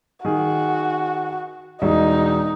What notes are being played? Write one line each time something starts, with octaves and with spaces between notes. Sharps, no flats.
D#3 F#4 G#4
E1 D#4